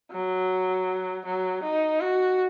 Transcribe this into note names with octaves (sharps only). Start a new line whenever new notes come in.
F#3
F#3
D#4
F#4